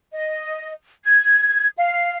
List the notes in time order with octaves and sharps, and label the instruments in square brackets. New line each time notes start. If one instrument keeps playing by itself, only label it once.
[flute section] D#5
G#6
F5